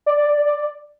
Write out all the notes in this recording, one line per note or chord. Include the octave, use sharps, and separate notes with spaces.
D5